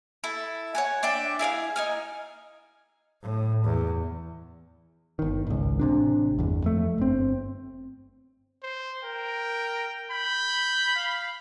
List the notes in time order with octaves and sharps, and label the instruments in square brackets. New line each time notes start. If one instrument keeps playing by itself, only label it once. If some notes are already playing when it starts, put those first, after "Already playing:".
[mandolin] E4 A4
C#5 F#5 G#5
D4 D5 E5 G5
E4 G#4 D#5 F5
D#4 G#5 F6
[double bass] A2
E2
[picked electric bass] G1 D#3
G#1 C#2
A1 C3 D4
G1 E2
F2 A3
G1 C4
[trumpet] C5
[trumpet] A#4 [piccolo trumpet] G5
[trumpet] B5 [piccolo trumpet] G6
[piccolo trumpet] F5